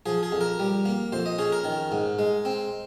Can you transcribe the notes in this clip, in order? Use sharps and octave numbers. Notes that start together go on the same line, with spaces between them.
F3 G#4
G#4
F2
A#4
G3
A#3
F2 C5
D#5
C#4 G#4
A#4
D#3
G#2
G#3
C4